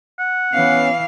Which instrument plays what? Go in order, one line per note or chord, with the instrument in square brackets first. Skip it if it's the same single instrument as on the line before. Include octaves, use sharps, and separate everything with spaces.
[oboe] F#5
[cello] E3 F5 [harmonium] B3 C#4